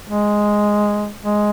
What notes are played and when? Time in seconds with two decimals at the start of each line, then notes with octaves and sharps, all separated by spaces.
0.09 G#3
1.23 G#3